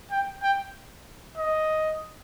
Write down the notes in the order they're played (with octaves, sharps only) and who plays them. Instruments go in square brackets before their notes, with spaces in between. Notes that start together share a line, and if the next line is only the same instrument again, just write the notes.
[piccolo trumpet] G5
G5
D#5